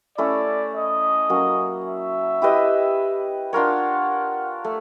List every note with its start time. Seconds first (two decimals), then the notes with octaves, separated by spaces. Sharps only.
0.18 A3 C#4 E4 D5
0.75 D#5
1.30 F#3 A#3 C#4 F#4
1.86 E5
2.42 E4 G4 B4 D#5
3.53 D4 F4 A#4 C#5 F#5
4.65 A3